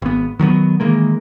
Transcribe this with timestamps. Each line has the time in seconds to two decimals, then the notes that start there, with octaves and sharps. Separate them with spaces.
0.02 G#1 B3
0.39 D#3 F#3 G#3 B3
0.80 D#3 E3 G#3 A#3